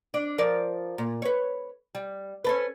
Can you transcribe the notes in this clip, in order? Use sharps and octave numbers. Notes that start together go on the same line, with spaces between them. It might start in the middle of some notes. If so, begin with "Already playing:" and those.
D4
F3 A#4 D5
A#2
B4 C#5
G3
C#4 A4 B4